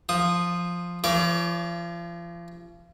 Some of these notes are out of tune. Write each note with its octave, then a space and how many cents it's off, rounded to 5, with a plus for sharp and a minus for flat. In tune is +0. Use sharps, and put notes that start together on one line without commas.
F3 +0 D#6 -15
F3 -35 C#5 +35 D6 +0